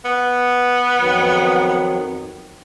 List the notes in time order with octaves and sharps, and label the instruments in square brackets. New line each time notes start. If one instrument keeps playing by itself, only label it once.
[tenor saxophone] B3
[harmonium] F2 D#3 F#3